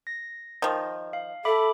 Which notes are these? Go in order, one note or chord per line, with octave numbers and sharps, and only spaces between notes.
A#6
D#3 F3
F5
A4 E5 B5 D6